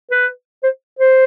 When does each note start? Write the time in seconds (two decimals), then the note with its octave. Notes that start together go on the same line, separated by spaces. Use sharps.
0.11 B4
0.63 C5
0.99 C5